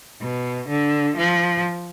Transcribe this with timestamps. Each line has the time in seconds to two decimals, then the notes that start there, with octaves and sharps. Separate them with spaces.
0.22 B2
0.69 D3
1.17 F3